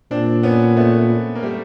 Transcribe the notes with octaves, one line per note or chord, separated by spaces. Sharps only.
A#2 C4 D4
B3 C#4
A3 B3
A#3
G3 A3